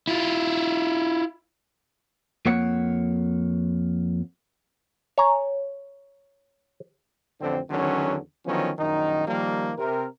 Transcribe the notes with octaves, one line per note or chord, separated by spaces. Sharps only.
E4 F4
F2 A#3 C#5 F#5
C#5 G#5 A#5
A1 F2 D3 C4
E2 D3 D#3 F#3 C#4
D3 D#3 F3 F#3 B3 C#4
A#1 F#2 D#3 D#4
D#3 F3 G3 A#3
C3 A#4